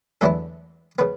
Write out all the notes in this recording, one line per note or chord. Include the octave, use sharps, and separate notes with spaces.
E2 D3 F#3 A3 B3 E4 A4
C#3 B3 B4